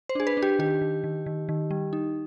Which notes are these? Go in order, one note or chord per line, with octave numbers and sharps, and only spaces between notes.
C5
D4 G#4
B4
D4
G4
D#3 G4
D#3
D#3
D#3
D#3
G3
D#4